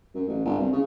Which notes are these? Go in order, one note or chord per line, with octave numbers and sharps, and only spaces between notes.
F#2
A1
G1
C2
C#3